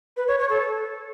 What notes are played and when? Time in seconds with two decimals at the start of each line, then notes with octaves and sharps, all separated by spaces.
0.17 B4
0.28 C#5
0.39 C#5
0.50 A4